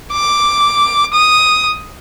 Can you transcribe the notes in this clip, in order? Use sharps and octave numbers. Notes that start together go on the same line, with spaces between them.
D6
D#6